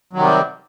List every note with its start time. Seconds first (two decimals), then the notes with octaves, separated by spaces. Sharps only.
0.13 F#3
0.16 D#3
0.19 C3
0.22 G3